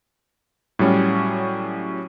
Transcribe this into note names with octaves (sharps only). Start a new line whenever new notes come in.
A2 F#3 G3 C#4